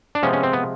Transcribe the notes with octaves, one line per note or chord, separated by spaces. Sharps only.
D4
C3 F3 G#3 B3 C#4
C#4
C4
B3